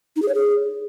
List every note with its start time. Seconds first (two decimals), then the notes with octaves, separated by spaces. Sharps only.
0.16 D#4
0.22 G#4
0.28 C#5
0.35 G#4